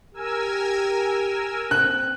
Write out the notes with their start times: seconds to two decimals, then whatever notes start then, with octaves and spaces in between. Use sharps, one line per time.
0.14 G4 A#4 G#5 E6
1.71 C4 F#6